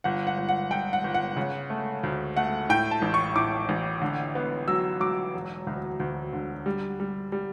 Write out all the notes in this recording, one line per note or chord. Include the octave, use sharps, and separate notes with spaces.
G1 F#5
F#5
G1
F#5
G1 G5
F#5
G1
F#5
C#3
A3
D2
A3 F#5
A2 G5
A5
A1
C#6
A2 D6
A1
D3
B3
F#3 E6
F#3 D6
E1
D2
D2
D3
G3
G3
G3